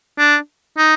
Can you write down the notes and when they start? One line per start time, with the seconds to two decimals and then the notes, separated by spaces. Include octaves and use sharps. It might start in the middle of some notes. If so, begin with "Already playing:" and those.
0.18 D4
0.78 D#4